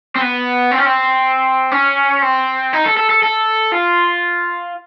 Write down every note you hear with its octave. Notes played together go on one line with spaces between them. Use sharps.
C4
B3
C4
C#4
C4
C#4
C4
D#4
A4
A4
A4
A4
F4